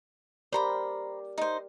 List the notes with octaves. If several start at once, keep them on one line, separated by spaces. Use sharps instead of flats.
G4 A#4 C5 D5 A#5 B5
D#4 C5